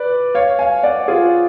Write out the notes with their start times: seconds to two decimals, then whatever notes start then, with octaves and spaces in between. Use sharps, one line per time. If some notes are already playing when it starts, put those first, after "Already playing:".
Already playing: B4 D5
0.35 C#5 F5
0.59 F5 G#5
0.83 D5 F#5
1.08 F4 G#4